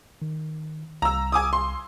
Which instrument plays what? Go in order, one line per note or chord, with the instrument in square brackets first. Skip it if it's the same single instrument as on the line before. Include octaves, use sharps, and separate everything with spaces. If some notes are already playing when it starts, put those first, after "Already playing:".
[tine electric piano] D#3
[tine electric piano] C2 [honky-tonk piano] A#5 E6
[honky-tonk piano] G#5 D6 D#6
C6